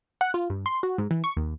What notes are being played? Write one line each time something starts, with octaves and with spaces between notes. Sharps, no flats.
F#5
F4
G2
C6
F#4
G#2
E3
C#6
D#2